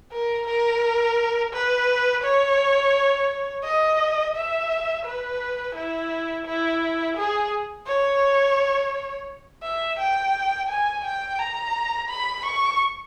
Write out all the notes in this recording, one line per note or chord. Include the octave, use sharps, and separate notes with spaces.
A#4
A#4
B4
C#5
D#5
E5
B4
E4
E4
G#4
C#5
E5
G5
G#5
G5
A#5
B5
C#6